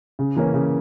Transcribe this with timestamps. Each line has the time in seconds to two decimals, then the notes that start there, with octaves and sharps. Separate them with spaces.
0.19 C#3
0.36 E3 A#3 C#4
0.54 C#3